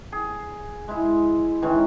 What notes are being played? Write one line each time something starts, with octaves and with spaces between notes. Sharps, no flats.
G#4
G#3 E4
D#3 E3 G#3 C#4